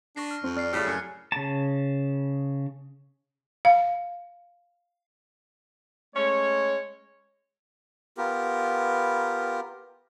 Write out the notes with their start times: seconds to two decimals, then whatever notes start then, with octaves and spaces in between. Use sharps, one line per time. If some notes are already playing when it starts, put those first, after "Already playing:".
0.16 D4 C#6 A#6 C7
0.31 F6
0.44 F2 C4
0.57 D5 F6 C7
0.73 A2 C#3 G3 F6 A6
0.86 F#2 G#5 F#6 C#7
1.32 C#3 A5
3.65 F5
6.15 G#3 A3 C#4 C#5
8.17 B3 F4 G4 A#4